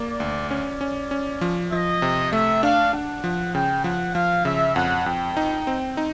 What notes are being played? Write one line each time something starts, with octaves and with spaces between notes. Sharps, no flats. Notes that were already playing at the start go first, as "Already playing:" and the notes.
Already playing: A#3 D5
D2
C#4 D5
C#4
C#4
F3
F3 D#5
C3
A3 E5
D4 F5
D4 F#5
F3
C#3 G5
F3 F#5
F3 F5
C#3 E5
F2 F#5
F2 G5
D#4
C4
D#4